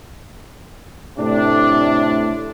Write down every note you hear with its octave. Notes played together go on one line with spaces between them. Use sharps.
A2 C3 A3 D4